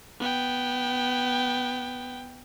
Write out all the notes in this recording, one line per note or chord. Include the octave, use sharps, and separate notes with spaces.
B3 G5